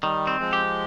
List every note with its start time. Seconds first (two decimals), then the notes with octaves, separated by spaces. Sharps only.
0.02 D#3 G3
0.27 C4
0.40 F3 G#3
0.53 G4